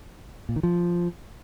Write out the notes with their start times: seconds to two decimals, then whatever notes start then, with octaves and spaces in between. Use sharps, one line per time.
0.49 A#2
0.56 D#3
0.63 F3